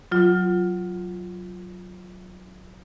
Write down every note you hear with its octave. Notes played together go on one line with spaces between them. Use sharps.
F#3 F4